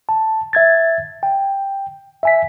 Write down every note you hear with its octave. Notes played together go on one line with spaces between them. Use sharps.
A5
E5 G#6 A6
G5
E5 G#5 B6